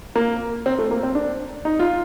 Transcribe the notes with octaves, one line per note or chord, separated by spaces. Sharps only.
A#3
C4
A3
A#3
C4
D4
D#4
F4